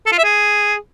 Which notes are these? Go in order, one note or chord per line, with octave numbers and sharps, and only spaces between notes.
A4
F4
E5
G#4